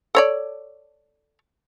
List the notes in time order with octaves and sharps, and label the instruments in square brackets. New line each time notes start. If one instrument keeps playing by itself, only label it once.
[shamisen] A4 C#5 D5